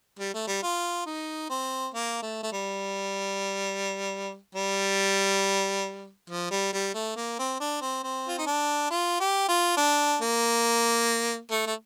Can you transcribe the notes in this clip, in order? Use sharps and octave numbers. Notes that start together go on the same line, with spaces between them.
G3
A3
G3
F4
D#4
C4
A#3
A3
A3
G3
G3
F3
G3
G3
A3
A#3
C4
D4
C4
C4
F4
D#4
D4
F4
G4
F4
D4
A#3
A3
A3